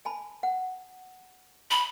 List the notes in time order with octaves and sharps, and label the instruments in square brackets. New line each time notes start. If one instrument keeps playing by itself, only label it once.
[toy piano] G#5 A5 B5
F#5
[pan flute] B5